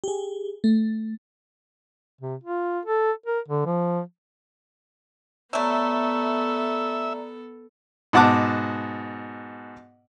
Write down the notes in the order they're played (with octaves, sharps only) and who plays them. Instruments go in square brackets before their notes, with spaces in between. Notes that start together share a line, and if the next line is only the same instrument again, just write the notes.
[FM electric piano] G4 G#4
A3
[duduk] C3
F4
A4
A#4
D3
F3
[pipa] F#3 A3 [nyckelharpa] B3 A4 [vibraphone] D5 A#5 [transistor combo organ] E5
[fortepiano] G#2 B2 F#5 A5 D6 F#6